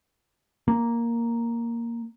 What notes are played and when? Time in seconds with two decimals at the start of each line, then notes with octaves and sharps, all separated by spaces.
0.68 A#3